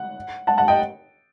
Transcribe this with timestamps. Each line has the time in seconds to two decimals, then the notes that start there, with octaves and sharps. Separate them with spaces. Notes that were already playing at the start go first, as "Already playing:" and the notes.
Already playing: F#5
0.47 F#5 A5
0.58 F#5 A5
0.68 D#5 G5